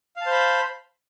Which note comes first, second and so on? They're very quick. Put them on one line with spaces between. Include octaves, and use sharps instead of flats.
F5 A5 C5 B5